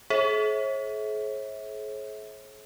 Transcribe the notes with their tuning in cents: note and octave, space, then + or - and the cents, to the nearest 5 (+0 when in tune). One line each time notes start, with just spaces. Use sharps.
G#4 +45 C#5 -45 E5 -30